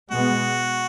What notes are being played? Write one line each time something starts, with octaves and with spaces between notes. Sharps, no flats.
B2 G#3 B3 F#4